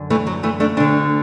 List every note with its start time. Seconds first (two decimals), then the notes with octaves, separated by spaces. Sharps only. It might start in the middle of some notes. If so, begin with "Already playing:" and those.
Already playing: F#2 D3
0.10 E3 A3
0.27 F#3
0.43 E3 A3
0.60 A3 D4
0.77 D2 D3 A3 D4